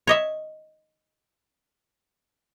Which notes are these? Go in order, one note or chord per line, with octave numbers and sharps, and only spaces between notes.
C#5 D#5 E5